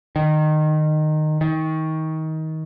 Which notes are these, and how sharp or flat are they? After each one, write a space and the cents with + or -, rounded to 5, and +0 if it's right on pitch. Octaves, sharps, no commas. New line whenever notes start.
D#3 -20
D#3 +25